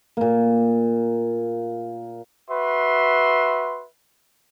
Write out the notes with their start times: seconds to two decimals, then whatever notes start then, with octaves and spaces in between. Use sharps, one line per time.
0.17 A#2 A#3
2.50 F#4 B4 E5 C6